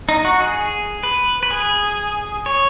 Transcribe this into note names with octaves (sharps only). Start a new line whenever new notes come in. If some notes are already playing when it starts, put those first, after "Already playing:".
D#4
F#4
G#4
B4
B4
G#4
C#5